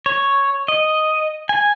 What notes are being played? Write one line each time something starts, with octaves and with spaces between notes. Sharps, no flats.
C#5
D#5
G#5